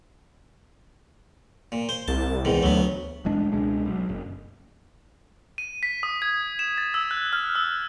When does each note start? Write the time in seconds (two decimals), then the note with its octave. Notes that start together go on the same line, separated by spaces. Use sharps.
1.72 A#2
1.89 C5
2.08 C2 A5
2.45 E2 G#2 D#3
2.63 D2 F#3 B3
3.25 D1 A1 G#3 D4
3.52 C#2 B2 G#3 D4
3.85 B1
4.09 F#1
5.58 D#7
5.83 B6
6.03 D#6
6.22 G#6
6.59 E7
6.78 A6
6.94 E6
7.11 F#6
7.33 F6
7.55 E6